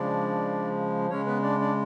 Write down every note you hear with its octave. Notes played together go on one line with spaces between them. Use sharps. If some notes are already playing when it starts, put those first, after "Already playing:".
Already playing: C#3 F3 G#3 D4 D5
C#3 G#3 C#4 C#5
B3 B4
D4 D5
D4 D5